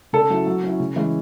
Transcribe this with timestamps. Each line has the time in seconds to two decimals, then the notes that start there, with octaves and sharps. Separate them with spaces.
0.13 C#3 A4
0.30 F#3 C#4 E4
0.46 F#3
0.63 C#4 E4
0.80 C#3
0.96 E3 G#3 C#4